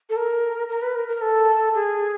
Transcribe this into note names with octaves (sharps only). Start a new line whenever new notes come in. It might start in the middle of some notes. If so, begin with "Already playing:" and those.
A4
A#4
A#4
B4
A#4
A#4
A4
G#4